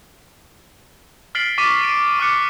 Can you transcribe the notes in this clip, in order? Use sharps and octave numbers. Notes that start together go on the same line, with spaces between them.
F6 A6 B6 C7 D7 F#7
C#6 D6 A6 B6 D#7
C7 D7 D#7
C#6 D6 F6 F#6 C#7